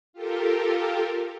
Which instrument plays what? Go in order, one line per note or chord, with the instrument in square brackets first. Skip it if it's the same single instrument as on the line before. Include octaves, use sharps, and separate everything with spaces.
[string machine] F4 G4 A4 A#4